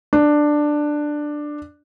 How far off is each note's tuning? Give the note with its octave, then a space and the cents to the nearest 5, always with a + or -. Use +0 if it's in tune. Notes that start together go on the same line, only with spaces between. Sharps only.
D4 +10